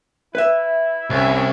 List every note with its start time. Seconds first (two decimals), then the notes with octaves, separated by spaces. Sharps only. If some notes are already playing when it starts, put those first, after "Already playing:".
0.35 E4 B4 E5
1.10 C2 C#4 E5